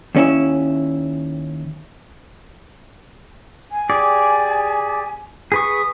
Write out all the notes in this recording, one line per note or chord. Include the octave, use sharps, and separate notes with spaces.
D#2 C#4 E4
G#5
G4 G#4 D5
G#4 B4 C#6 D#6